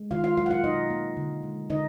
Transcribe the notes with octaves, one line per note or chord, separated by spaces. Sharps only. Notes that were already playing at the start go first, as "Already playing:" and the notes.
Already playing: G#3
D#3 F4 F5
F4 F5
F#3 F4 F5
F#5
F4 F5
B2 D#4 D#5
A#3
D3
G#3
D3 D#4 D#5